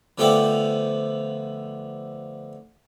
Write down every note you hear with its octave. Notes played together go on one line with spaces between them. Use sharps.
D3 F3 A3 B3 G5 D6